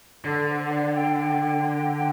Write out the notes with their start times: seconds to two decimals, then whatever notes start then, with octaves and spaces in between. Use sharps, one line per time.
0.25 D3 A4
0.48 C5
0.71 D5
0.93 G5
1.16 G5